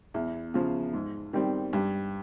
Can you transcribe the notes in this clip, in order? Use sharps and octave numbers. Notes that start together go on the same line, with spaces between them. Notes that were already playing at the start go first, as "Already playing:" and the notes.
E2
C#3 F3
G#2
D#3 G3 C4
G2